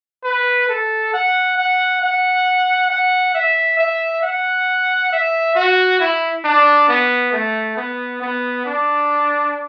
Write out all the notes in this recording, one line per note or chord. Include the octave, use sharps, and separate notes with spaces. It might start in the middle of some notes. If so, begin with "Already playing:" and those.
B4
A4
F#5
F#5
F#5
F#5
E5
E5
F#5
E5
F#4
E4
D4
B3
A3
B3
B3
D4